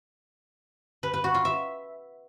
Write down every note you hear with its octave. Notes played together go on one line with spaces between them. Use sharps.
B4
B4
F#4
F4
E5